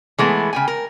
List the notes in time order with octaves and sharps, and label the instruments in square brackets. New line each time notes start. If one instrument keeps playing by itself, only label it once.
[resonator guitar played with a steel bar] E3 G#3 A3 B3
C#3 G5 G#5
A#4